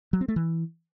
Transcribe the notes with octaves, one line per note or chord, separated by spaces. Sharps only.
F#3
C4
A3
E3